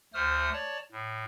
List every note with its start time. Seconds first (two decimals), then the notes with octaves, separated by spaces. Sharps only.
0.14 D2 A3 C5 D#6 F6
0.53 C#5 D5 A5
0.92 A2